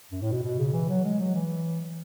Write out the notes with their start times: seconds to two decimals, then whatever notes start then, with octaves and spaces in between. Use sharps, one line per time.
0.12 F#2
0.22 A2
0.32 B2
0.43 B2
0.59 C#3
0.73 E3
0.89 F#3
1.05 G#3
1.20 F#3
1.35 E3